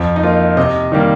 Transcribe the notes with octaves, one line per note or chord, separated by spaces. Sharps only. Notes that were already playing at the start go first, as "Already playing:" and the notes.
Already playing: F2
D#4
F3 A#3 F4
C3 D#5
D#3 G3 A#3